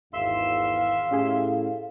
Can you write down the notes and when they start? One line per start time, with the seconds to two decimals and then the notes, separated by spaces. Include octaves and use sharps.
0.14 G#1 E2 E5 F5 C6 E6
1.11 A2 C#4 G4 G#4